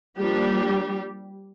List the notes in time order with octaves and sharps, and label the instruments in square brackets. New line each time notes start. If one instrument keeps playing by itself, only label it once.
[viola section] F3 G3 A#3 D4 G4